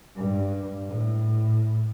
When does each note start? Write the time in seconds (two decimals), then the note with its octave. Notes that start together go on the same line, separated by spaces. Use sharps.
0.16 G2
0.88 A2